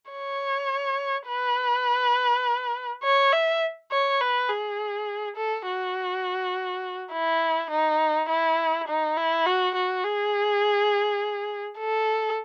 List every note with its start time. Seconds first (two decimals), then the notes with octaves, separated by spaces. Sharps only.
0.12 C#5
1.28 B4
3.04 C#5
3.33 E5
3.91 C#5
4.21 B4
4.49 G#4
5.36 A4
5.67 F#4
7.13 E4
7.71 D#4
8.29 E4
8.88 D#4
9.17 E4
9.46 F#4
9.75 F#4
10.04 G#4
11.79 A4